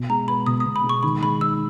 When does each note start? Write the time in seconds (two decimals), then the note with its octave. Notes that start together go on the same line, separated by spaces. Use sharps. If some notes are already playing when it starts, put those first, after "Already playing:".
Already playing: B2
0.09 G#3 A#5
0.28 B3 B5
0.46 B2 D#6
0.60 D#6
0.66 B2
0.76 B5
0.84 G#3
0.89 C#6
1.03 D#3 B5
1.22 G#3 B5
1.41 D#4 E6